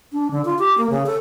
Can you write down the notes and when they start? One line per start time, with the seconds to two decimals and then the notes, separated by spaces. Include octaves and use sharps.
0.13 D4
0.31 D3
0.45 F4
0.59 G4
0.78 A#3
0.90 C#3
1.06 A4